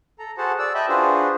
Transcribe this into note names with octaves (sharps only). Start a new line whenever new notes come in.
A4 A#5
F#4 G#4 A4 C5 F#5 A5
D5 E6
D#5 E5 G5 A5 B5
D4 F4 F#4 G#4 B4 C5